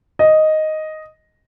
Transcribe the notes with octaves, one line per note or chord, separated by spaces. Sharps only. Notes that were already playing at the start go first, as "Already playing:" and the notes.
D#5